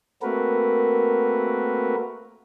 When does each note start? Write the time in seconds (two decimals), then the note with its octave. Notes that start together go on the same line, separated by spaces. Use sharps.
0.22 A3 A#3 C4 F#4 A#4 B4